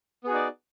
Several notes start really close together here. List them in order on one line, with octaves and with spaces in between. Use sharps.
B3 G#4 F#4 D#4 D5